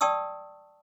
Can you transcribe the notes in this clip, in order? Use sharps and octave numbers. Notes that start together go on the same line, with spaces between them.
D5 G5 A5 C#6 D#6 E6